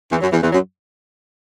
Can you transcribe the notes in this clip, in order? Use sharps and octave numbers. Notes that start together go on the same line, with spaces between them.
E2 E3
F#2 F#3
E2 E3
E2 E3
F#2 F#3